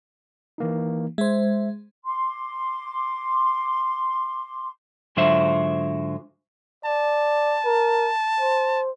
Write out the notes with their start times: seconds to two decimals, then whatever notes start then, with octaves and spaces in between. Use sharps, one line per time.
0.58 E3 A#3 D#4
1.18 G#3 C5 E5
2.05 C6 D6
5.17 G#2 D3 F#3 F4 C5 E5
6.85 D5 A5
7.65 A#4
8.40 C5